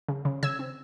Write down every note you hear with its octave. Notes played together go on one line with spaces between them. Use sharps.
C#3
C#3
C#3 E6 G#6
C4